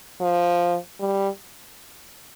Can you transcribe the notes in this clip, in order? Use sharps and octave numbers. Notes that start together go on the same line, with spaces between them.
F3
G3